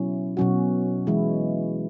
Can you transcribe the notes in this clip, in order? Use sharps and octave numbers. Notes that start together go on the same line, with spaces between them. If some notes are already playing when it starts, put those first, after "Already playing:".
Already playing: B2 F#3 C#4 E4
B2 F#3 C#4 F#4
E3 G#3 E4